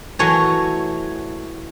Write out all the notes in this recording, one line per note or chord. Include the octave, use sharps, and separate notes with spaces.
E3 F#3 A3 C#5 G#5 A#5